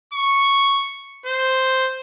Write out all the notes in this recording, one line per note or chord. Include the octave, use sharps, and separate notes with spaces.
C#6
C5